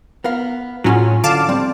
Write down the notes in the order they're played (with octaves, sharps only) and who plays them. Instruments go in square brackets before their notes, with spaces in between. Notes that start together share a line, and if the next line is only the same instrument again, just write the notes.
[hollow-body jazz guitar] B3 A#4 F5
[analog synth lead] A2 [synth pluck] F#3 C#4 [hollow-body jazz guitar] A#3 F4 G#4
[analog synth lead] D3 [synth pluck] F5 A5 D6
[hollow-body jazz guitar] F3 C4 [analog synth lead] G3